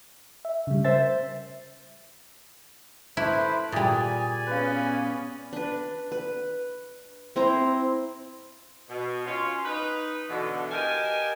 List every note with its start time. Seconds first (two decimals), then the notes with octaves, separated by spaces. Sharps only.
0.45 E5
0.67 C#3 G3
0.84 C5 E5 A6
3.17 A3 E4 B4 C5 B5 D6
3.72 A#2 G3 G#4 D5 G#5
4.47 B3 C#4 B4 F5
5.53 D4 B4
6.12 B4
7.36 C4 E4 C5 A#5
8.89 B2
9.26 C#4 F4
9.65 D#4 B4
10.29 B2 D3 E3
10.71 G4 A#4 D#5 F5 G#5 A5